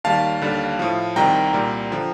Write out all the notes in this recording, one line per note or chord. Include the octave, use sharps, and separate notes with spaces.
D#2 D#3 G3 F5 A5
D#2 D3 G3
A2 F3
C2 C3 D#3 G3 G5 A#5
C2 A#2 G3
D3 F3